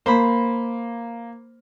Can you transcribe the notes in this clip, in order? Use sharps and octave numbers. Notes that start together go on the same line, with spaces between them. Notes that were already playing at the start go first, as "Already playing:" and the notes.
A#3 C5 B5